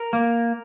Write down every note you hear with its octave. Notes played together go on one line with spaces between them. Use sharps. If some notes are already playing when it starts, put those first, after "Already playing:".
Already playing: A#4
A#3